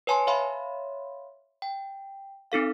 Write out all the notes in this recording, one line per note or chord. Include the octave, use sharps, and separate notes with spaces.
B4 C#5 G#5 A5 C6
C#5 E5 F5 B5 C6
G5
C4 D#4 A4 F5